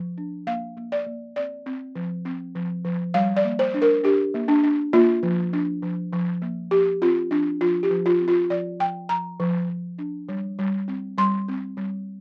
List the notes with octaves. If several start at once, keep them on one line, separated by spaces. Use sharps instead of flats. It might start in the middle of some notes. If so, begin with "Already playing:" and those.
Already playing: F3
D4
A#3 F5
A#3
D5
A#3
C4 D5
C4
F3
C4
F3
F3
G3 F5
D5
A#3
C5
D4
A#4
D4 G4
A#3
D4
D4
A#3 F4
F3
D4
F3
F3
A#3
F3 G4
C4 F4
F3 D4
F3 F4
G4
F3
F4
C4
F4
F3 D5
F3 G5
F3 A#5
F3
F3
D4
G3
G3
C4
G3 C6
C4
G3